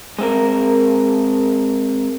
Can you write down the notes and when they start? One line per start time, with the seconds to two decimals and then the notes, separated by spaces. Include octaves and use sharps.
0.18 G#3 C4 A#4